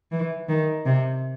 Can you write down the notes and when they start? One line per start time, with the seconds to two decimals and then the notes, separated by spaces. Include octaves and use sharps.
0.12 E3
0.49 D#3
0.86 C3